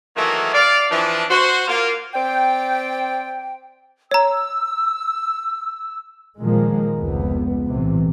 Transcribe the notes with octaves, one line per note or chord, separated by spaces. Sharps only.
D#3 E3 F#3 A3 A#3
D5 F5
E3 F3 D4
F#4 C5
A#3 F4
C4 D5 G5
C#5 A#5 E6
A#2 D#3 F3 G#3 A#3
F1 C#2 B3
B1 A2 C3 E3